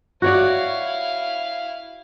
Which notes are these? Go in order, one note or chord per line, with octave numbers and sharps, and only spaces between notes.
E4 F#4 C#5 D5 F5